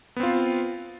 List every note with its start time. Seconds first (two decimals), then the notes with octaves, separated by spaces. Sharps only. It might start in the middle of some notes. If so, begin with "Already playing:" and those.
0.16 B3
0.20 C4
0.23 F4